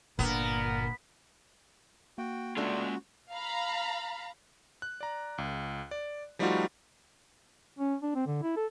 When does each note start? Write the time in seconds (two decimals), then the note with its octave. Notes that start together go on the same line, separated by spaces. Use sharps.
0.19 G1 A#2 D3 B3 A#4
2.18 A#3 F#4 G5
2.57 G#3 A3 C#4 D4 F4 F#4 A4
3.33 F5 A#5 B5
4.82 F#6
5.01 D5 A#5
5.38 C#2
5.91 D5
6.39 F3 G3 A3 D#4 F4 F#4
7.79 C#4
8.02 D4
8.15 C4
8.26 D3
8.42 E4
8.56 A4